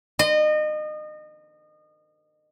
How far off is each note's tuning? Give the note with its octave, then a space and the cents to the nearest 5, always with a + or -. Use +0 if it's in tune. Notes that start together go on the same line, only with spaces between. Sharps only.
D#5 -30